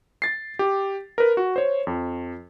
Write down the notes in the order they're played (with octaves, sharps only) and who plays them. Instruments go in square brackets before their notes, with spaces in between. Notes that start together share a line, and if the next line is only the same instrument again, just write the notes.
[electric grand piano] A6 C7
G4
A#4 B4
F#4
C5 C#5
F2